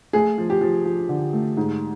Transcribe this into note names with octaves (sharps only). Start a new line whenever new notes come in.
A3 G#4
F3
G4
F3
F3
D3
A3
G#2